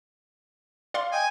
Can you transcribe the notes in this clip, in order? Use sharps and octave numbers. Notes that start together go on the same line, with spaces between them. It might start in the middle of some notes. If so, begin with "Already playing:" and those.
D5 F5 C6
D#5 G5 G#5